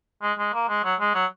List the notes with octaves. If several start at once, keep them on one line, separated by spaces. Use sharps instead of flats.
G#3
G#3
A#3
G#3
F#3
G#3
F#3